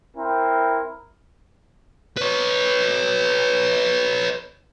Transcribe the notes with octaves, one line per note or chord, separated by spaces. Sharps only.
C4 E4 A#4
B4 C#5